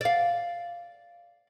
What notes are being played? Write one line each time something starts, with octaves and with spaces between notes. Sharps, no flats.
D5 F5